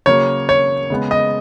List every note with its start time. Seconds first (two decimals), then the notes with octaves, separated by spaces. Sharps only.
0.06 C#3 F#3 A#3 C#5
0.49 C#5
0.90 C#3 G#3 B3
1.11 D#5